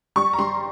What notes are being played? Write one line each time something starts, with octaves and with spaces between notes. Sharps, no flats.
G3 C#6
A#5
G3 C6